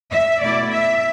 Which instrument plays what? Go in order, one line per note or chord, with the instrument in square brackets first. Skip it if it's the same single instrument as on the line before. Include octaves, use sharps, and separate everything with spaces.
[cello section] E5
B2 A3 E4 D5
E5